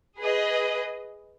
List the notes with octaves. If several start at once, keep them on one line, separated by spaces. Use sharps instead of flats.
G#4 B4 D#5